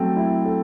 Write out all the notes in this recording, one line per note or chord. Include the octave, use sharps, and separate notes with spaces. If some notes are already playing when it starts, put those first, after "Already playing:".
Already playing: F#3 A3 C4 A4
E4
A4